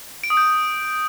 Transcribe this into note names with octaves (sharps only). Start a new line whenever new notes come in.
D7
D#6
G6